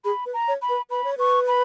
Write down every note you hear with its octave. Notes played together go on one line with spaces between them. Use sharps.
G#4 B5
B4
A#5
C#5
B5
B4
B4 B5
C#5
B4 C#6
B5